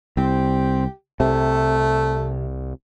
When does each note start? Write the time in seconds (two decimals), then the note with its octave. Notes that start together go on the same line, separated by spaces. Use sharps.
0.17 C2 C4 G4
1.20 C2 C3 A3